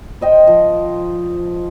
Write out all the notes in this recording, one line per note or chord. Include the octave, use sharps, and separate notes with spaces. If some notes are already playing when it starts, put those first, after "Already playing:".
C5 D#5 G5
F3